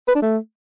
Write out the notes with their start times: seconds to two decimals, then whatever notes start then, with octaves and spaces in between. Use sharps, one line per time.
0.08 B4
0.15 D4
0.22 A3